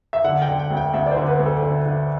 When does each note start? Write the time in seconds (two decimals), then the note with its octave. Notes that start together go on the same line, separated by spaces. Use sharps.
0.13 E5
0.24 D3 F#5
0.42 G5
0.47 D3
0.59 G5
0.70 D2
0.77 G5
0.94 D2 E5
1.06 D5
1.11 C5
1.17 D3
1.28 B4
1.39 D2
1.46 A4
1.63 D3
1.85 D3